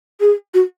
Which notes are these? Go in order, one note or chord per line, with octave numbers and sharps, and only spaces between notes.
G#4
F#4